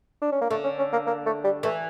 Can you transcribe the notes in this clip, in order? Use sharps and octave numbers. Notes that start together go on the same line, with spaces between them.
D4
C#4
A#3
D3 A3
C#4
C#4
A#3
A#3
A3
G3
E3 A3